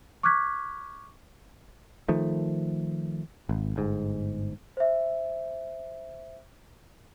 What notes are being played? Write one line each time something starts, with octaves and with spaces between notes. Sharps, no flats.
C#6 D6 F6 F#6 G#6 B6
D#3 F3 A3
G#1
G1 G#2
C5 E5